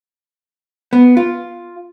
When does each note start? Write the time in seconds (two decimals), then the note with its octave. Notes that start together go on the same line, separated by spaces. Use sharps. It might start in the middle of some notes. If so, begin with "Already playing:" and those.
0.93 B3
1.17 F4